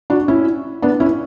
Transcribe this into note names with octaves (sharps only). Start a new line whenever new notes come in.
D4 F#4
C#4 E4
B3 D4
C#4 E4